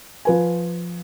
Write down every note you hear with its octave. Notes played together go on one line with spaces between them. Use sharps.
F3 B4 G#5